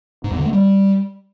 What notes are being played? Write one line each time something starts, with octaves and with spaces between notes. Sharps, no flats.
G#2
E2
D3
A3
G3